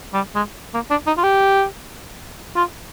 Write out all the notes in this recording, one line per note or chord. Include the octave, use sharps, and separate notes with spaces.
G3
G#3
A#3
D4
D#4
F4
G4
F4